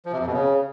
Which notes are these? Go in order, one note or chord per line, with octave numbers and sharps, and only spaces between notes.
F3
C3
F2
B2
C#3